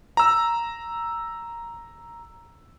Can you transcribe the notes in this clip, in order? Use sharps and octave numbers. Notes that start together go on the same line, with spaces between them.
A#5 E6